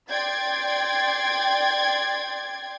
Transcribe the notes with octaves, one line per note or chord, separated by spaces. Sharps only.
D5 G5 C6 G#6 A6